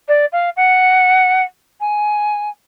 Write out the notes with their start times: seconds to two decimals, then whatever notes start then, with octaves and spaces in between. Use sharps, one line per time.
0.08 D5
0.32 F5
0.57 F#5
1.80 G#5